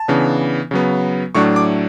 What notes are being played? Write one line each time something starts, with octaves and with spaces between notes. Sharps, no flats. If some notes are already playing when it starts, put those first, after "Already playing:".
Already playing: A5
C#3 E3 B3 D4
C#3 F#3 B3
A2 F#3 A3 D4 C#6
D6